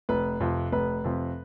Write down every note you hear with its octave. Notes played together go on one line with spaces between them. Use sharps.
F1 B4
F2 C3 F3
F1 B4
F2 C3 F3